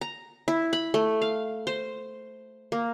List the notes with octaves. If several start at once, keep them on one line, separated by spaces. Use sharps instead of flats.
A#5
E4
B5
A3
F5
C5
A#3